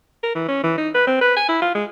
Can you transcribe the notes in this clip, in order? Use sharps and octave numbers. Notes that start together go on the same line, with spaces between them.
A#4
E3
C#4
E3
D#4
B4
C4
B4
G#5
E4
F4
G#3